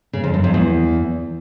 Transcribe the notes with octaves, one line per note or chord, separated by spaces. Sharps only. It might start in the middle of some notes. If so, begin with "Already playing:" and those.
C#3
F2
F#2
F2
E2